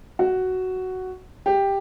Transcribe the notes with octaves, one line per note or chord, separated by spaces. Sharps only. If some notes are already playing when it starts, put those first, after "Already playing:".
F#4
G4